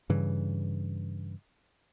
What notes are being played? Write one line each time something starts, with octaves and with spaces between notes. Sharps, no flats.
G2 C#3 E3